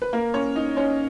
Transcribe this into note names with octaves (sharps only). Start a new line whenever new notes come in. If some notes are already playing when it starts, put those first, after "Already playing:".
B4
A#3 A#4
C#4 C#5
D#4 D#5
C#4 C#5